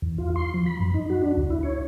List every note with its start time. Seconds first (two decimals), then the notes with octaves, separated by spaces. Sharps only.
0.02 E2
0.18 F4
0.36 C6
0.54 F3
0.66 B5
0.80 F#2
0.94 D#4
1.10 F#4
1.22 D4
1.37 D2
1.50 E4
1.63 C#5